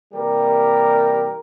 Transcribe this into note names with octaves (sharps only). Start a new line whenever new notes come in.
C3 E3 G3 A#3 G4 A#4